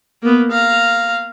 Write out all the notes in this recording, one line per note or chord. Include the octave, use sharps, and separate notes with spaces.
A#3 B3
F5 A#5